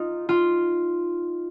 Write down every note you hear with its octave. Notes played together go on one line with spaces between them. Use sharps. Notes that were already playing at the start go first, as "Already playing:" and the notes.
Already playing: D#4 F4
F4